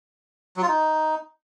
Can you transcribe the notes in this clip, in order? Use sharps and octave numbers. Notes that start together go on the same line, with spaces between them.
F#3
F4
D#4